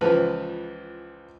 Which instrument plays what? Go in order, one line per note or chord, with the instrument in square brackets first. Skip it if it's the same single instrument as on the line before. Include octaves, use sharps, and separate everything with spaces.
[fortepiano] C#2 E3 F3 B4